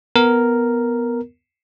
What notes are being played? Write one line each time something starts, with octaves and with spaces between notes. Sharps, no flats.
B3 A#4